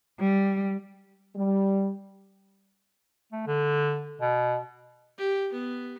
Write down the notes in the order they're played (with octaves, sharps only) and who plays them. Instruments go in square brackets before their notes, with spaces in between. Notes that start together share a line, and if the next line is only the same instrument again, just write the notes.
[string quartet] G3
[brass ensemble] G3
[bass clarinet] A3
D3
B2
[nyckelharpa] G4
B3